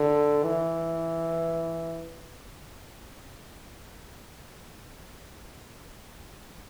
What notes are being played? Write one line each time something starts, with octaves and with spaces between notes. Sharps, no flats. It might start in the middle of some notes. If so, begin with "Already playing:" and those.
Already playing: D3
E3